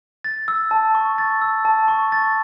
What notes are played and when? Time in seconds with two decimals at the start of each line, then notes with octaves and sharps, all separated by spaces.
0.24 A6
0.48 E6
0.71 A5
0.95 C#6
1.18 A6
1.41 E6
1.65 A5
1.88 C#6
2.12 A6